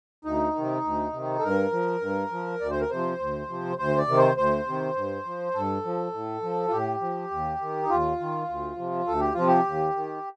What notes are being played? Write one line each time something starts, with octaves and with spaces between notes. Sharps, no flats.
D2 D#4
C3 D#3
D2
C3 D#3
A4
G2 A#4
F3
G2
F3
D2 D5
C5
A#4
C3 F3 C5
D2
C3 F3
D2 C5
D5
C3 D#3
C5
D2 C5
C3 D#3
G2
F3
G2 A4
F3
A2
F3
F4
A2 G4
F3
D#2
D#3
D#4
D#2 F4
D#3
D2
C3 F3
D2 A4
G4
C3 F3 F4
G4
D#2
D#3